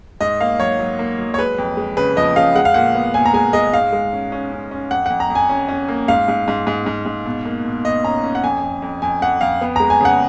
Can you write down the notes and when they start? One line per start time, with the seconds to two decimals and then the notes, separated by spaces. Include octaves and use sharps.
0.21 G#2 D#5
0.40 A#3 F5
0.60 F#3 C#5
0.79 F#3
0.99 A#3
1.19 F#3
1.34 C#5
1.38 G#3 B4
1.58 F2
1.77 G#3
1.97 C#3 B4
2.16 F3 D#5
2.36 C#3 F5
2.55 G#3 F#5
2.65 F5
2.74 A#2 F#5
2.95 B3
3.14 A#2 G#5
3.26 A#5
3.33 G#3 G#5
3.53 G#3 D#5
3.73 G#2 F5
3.92 G#3
4.13 C#4
4.32 C#4
4.52 C#4
4.71 C#4
4.91 F2 F#5
5.06 F2 F#5
5.20 A#5
5.30 F2
5.35 G#5
5.49 C#4
5.69 C#4
5.89 A#3
6.08 G#2 F5
6.28 G#2
6.48 G#2
6.67 G#2
6.86 G#2
7.06 G#2
7.26 B2
7.45 A#3
7.64 B2
7.85 B2 D#5
8.04 C#4 A#5
8.24 C#4
8.35 F#5
8.43 F2 G#5
8.63 F2
8.82 F2
9.02 F2 G#5
9.22 F2 F#5
9.41 F2 F5
9.61 B3
9.76 G#3 A#5
9.90 G#5
10.01 C#3 F#5